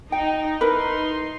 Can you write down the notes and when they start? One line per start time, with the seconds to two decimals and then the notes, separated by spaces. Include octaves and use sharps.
0.12 D#4 G5
0.61 D#4 E4 A#4 B4 C6